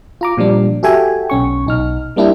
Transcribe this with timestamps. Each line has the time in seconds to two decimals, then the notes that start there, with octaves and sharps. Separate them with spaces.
0.21 F4 A#5 D6
0.37 A#2 F3 G3 D4
0.83 F#4 G4 A4 E5 G5 G#5
1.30 B1 C#4 C#6
1.66 B1 D#4 F6
2.16 G3 A#3 D4 E4 G4